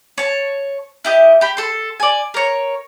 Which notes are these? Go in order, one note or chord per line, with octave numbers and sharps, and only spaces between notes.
C#5 A5
E4 G4 D#5
G4 B5
A4 C6
D5 G#5
A#4 C#5